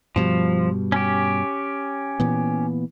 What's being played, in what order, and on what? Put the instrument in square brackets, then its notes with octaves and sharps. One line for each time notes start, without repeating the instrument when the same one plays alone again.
[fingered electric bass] G2 B2 G3 [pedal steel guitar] F3
[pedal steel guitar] C#4 G4
[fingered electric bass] A#2 E3 B3